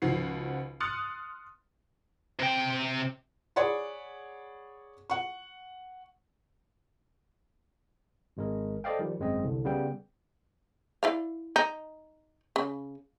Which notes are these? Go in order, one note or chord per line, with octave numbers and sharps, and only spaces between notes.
C#2 D#3 F3 F#4 C7
C6 D#6 F6 F#6 A6 C#7
C3 G5
G#4 C#5 D5 F#5 B5
F#5 C#6
G#1 G#3 A#4
A4 C5 D5 D#5 F5 G5
D#3 F3 G3
G#1 F#2 G#3 C4 D#5
C2 D3
C#3 G3 B3 G5
E4 D5 F5
D#4
C#3